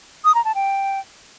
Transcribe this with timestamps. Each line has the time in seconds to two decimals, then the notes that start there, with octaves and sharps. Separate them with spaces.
0.24 D#6
0.34 A#5
0.45 A5
0.55 G5